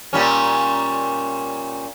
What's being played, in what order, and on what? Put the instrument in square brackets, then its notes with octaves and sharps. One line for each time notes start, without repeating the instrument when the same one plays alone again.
[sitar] A#2 G3 C#4